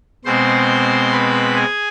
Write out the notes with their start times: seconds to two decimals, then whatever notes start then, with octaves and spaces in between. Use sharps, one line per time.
0.25 B2 G#3 C4 C5 C6
1.12 B4 B5
1.56 G#4 G#5